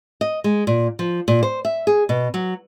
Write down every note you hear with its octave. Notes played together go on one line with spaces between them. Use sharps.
D#5
G#3
A#2
F3
A#2
C5
E5
G#4
B2
F#3